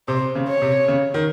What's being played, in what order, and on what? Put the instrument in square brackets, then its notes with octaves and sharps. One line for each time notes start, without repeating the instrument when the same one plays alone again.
[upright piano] C3 [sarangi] C5
[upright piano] C#3
[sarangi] C#5
[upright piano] C3
C#3
D#3